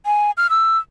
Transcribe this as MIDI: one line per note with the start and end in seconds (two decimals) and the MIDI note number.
0.06 0.31 80
0.38 0.47 89
0.50 0.78 88